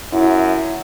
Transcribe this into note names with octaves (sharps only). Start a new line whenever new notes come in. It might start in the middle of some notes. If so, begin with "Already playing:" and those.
F#2 E4